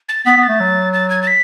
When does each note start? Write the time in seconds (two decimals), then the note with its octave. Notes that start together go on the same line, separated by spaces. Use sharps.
0.09 A6
0.26 B3 B6
0.37 B3
0.43 A6
0.49 A3
0.60 F#3
0.93 A6
1.10 G#6
1.22 A6
1.27 B6